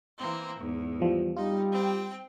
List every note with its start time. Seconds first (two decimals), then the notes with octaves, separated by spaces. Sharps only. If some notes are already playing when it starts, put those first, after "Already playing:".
0.18 E3 A#3 C4
0.59 E2 G#2
1.00 E3 F3 G3
1.36 G3 D#4 F4
1.71 C4 G5